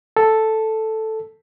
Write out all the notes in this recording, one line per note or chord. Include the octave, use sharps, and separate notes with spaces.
A4